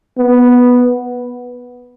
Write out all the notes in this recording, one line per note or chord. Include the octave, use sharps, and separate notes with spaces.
B3